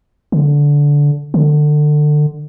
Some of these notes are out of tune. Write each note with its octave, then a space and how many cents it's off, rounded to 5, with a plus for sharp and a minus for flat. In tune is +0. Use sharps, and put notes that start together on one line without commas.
D3 -15
D3 +25